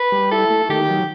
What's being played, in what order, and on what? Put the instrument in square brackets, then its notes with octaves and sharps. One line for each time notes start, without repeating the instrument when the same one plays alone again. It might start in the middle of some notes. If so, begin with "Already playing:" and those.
Already playing: [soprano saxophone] B4
[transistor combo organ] G3
[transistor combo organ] E4 [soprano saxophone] A4
[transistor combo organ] A3
[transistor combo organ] D#3 [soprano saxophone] G4
[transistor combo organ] F#3